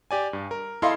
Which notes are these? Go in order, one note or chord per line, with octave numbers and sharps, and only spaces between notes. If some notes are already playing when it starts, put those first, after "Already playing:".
G4 D5 G#5
G2
A#4
E4 A4 D#5 F5 B5 C6